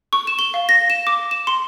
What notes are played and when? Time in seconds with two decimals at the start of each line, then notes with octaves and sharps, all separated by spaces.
0.13 C#6
0.27 E7
0.39 G7
0.54 F5
0.69 A#6
0.90 E7
1.07 D6
1.31 E7
1.47 C6